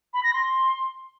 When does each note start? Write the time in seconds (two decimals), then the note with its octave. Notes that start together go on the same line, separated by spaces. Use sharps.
0.14 B5
0.24 A#6
0.33 C6